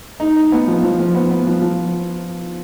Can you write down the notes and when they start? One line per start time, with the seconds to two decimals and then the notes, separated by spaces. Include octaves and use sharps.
0.20 D#4
0.36 D#4
0.52 B3
0.67 F3
0.83 F3
0.99 F3
1.15 B3
1.31 B3
1.47 F3
1.62 F3